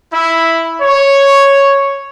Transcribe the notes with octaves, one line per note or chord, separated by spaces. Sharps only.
E4
C#5